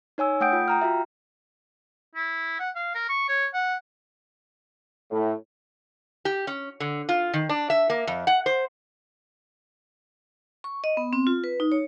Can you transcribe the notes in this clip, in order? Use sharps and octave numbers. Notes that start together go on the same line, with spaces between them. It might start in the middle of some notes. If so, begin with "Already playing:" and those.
D#4 C#5 G#5 E6
A3 F#5 G5 D#6 G6 D7
F4
G5 A#5 F6
F4 F#4 E5
E4
F#5
F5
A#4
C#6
C#5
F#5
A2
G4
C#4
D3
F4
D#3
D4
E5
A#3
F2
F#5
C5
C#6
D#5
B3
C4
F4
B4
D#4
C#5